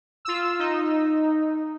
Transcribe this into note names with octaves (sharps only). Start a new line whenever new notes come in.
F4 E6
D#4